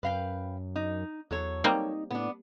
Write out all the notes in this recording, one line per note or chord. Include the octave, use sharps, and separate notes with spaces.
F#2 B4 F5 G5
D#4
E2 F#3 A4 C#5
G3 A#3 C4 D#4
A2 B3 D4